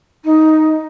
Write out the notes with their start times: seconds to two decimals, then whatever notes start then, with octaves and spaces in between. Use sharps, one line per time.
0.25 D#4